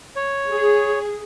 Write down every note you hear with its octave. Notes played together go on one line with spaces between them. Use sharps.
C#5
G#4